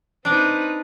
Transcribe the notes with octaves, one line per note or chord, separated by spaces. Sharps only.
C4 D4 D#4 B4 D5